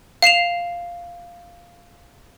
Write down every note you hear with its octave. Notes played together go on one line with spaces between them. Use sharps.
F5 C7 E7 F7